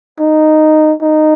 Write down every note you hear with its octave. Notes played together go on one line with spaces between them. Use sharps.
D#4
D#4